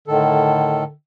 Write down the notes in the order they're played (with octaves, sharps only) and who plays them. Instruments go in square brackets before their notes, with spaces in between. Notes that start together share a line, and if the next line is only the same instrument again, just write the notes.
[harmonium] A2 D#3 A4 [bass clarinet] D3